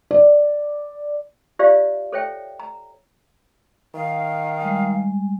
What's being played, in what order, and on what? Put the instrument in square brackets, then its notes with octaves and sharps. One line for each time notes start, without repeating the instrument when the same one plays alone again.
[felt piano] D5
[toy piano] F4 G4 C5 D5 E5 F5
A4 C5 C#5 E5 G5
A#5
[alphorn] D#3 [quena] F5
[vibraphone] G3 G#3 G#5